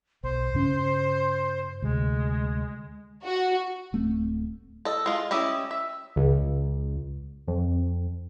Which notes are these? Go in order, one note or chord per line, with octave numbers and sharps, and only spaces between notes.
B1 C5
G2 C#3 C#4
D2 C3 G#3
F#4
D1 A3 C4
A4 D#5
G#3 F4
C#4 E4 G4 D#5
E5
C#2
F2